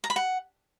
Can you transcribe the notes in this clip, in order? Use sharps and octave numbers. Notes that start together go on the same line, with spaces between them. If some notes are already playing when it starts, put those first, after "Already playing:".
A#5
B5
F#5